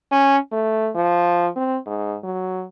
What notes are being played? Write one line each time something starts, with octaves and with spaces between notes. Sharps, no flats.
C#4
A3
F3
C4
G#2
F#3